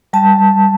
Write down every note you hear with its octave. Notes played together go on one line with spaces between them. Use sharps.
G3 A5
G3